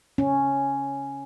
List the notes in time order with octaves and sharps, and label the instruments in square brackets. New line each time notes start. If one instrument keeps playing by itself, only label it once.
[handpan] C#4